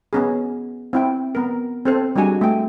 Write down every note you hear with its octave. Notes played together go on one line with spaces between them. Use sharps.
B3 C#4 G#4
C4 E4 G5
B3 A#4
C4 A4 C5
G3 G#3 D4 F#4 G#5
A3 G5